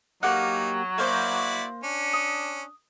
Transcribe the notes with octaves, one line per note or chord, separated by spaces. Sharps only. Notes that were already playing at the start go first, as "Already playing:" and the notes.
F#3 A#3 D#4 G4 F#5
A#3 E4 F#4 C5 D5 G6
C#4 D4
D#6